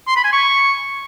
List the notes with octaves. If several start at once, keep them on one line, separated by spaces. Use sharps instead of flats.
C6
B5
G#5
C#6